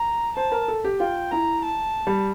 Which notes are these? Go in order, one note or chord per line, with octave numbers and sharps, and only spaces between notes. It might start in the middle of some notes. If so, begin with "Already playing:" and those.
Already playing: A#5
C5 A5
A#4
A4
G4
F4 G5
E4 A#5
A5
G3